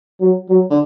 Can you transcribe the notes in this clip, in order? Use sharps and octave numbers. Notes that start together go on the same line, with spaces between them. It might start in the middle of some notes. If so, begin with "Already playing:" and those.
F#3
F#3
D3